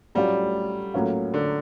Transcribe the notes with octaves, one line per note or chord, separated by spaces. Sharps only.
A2 F#3 G3 A3 C#4 F4
A2 F#3 A#3 C#4 F4
D3